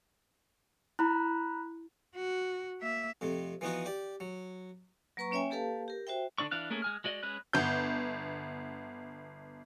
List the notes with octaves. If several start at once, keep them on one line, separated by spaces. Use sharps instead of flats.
E4 A#5 B5 F#6
F#4
A#3 E5
F2 C3 A3
E3 F3 B3 D#4 F#4
G4 D5
F#3
F#3 A#3 B4 A#5 C#6
A#3 C#4 C#5 E5 G5 G#5
A#3 G4 A4 B4 F5 A5
G4 A#4
F#4 C5 E5 G5
D3 D4 D5 C#6
E3 D4 F5 F#6
A3 A#3 C#4 G#4
G#3 G#5 F6
G#3 F#4 D5 D#5
G#3 C#4 B4 F#6
G1 B3 G6